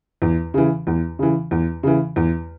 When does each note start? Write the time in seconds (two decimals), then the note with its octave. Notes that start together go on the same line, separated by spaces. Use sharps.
0.22 E2
0.54 C#3 E3
0.87 E2
1.19 C#3 E3
1.51 E2
1.83 C#3 E3
2.16 E2